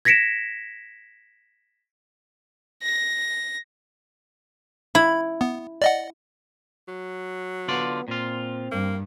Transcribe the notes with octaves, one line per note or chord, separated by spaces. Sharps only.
G#6 A#6 B6 C#7 D7 E7
A#6
E4 B5
B3
D5 D#5 F#5
F#3
D3 B3 F4 D5
A#2 C4 F4
G2 A#3